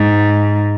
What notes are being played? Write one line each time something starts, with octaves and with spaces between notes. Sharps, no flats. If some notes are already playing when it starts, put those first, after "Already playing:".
Already playing: G#2